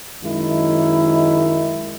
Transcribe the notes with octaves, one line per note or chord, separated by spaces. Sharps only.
F#2 D#3 G#3 E4